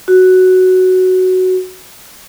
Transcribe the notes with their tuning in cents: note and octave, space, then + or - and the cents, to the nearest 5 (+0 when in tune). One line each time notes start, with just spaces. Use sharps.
F#4 +5